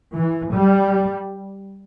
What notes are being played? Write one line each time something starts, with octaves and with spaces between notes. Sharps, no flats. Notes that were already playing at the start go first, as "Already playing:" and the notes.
E3
G3